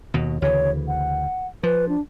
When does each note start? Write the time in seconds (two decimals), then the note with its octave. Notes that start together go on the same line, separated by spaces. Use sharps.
0.14 D#2 B2
0.42 D2 C#3 E3 C#5
0.88 F#5
1.63 F3 B4
1.89 D4